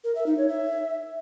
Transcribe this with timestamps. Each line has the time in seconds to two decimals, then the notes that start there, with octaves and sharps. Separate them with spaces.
0.04 A#4
0.15 E5
0.26 D#4
0.38 C#5
0.49 E5